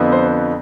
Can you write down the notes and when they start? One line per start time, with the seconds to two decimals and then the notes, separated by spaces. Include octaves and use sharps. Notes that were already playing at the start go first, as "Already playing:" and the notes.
Already playing: F2 D3 F3 B3
0.12 C5